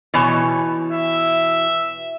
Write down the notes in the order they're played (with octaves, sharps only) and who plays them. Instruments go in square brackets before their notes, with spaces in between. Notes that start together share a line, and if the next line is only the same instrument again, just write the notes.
[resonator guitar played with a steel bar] B2 E3 C#5
[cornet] E5